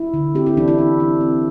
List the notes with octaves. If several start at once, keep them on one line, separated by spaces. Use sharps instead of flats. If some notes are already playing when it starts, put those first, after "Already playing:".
Already playing: E4
D3
C4 G4
E4
E3 D4
E4
D4
D4
C4